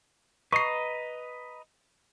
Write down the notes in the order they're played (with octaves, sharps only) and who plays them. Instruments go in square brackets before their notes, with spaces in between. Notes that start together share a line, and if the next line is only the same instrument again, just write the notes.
[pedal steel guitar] B4 D#5 A#5 [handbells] C#6 C7